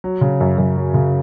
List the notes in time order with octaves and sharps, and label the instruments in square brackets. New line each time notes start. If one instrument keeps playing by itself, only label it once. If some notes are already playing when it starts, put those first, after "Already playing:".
[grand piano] F#3
C#3
F#2
F#2
F#3
C#3